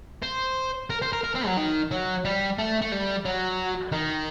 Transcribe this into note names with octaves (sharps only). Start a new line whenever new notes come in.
C5
A#4
C5
A#4
A#4
C4
F#3
D#3
F#3
G3
A3
A3
G3
F#3
D#3